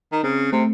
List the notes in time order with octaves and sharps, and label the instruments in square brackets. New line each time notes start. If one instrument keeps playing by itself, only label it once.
[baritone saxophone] D#3
[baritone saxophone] C#3 [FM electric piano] C4
[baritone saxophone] C3 [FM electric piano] A3